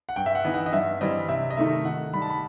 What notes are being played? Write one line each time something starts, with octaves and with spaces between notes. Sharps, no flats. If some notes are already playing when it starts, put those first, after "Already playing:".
F#5
G2 G5
E5
F#5
E3 B3 D#4
F#5
D#5
G2 E5
E3 G3 C4 D#5
C3 E5
D#5
D#3 A3 D#4 E5
D#3 F#5
G3 D#4 B5
A5
B5